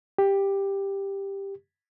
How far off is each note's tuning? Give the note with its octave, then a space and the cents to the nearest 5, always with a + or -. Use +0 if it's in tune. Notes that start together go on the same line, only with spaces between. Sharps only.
G4 +5